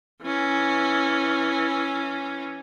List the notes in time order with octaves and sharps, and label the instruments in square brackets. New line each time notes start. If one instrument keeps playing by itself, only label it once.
[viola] E3 C#4